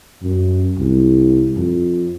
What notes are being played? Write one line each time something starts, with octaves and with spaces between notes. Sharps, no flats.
F#2
C2
F2